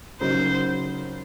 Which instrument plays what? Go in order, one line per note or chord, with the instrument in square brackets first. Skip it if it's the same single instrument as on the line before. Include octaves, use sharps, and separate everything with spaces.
[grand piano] C#3 F#3 A#3 D#4 [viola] C5